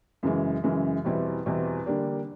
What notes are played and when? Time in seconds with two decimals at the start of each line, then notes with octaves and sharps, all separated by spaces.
0.23 F#2 C#3 E3 G#3
0.64 F#2 C#3 E3 G#3
1.04 E2 B2 G3 C4 E4
1.46 E2 B2 G3 C4 E4
1.86 D3 G3 A#3 D4 G4